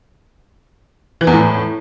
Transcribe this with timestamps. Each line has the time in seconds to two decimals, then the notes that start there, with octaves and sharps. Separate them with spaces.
1.21 E3
1.27 E2
1.33 A2